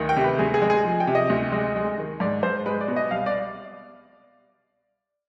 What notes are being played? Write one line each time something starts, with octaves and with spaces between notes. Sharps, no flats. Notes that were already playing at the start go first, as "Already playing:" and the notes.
Already playing: D2 D#3
G5
C3
B4
D2 G#4
G#4
G#3
G#4
F3
G5
C3
D#5
D2
G#3
G#3
D#3
G#2 D5
G#2 C5
G#3 B4
D5
B2
D#5
C2 F5
D5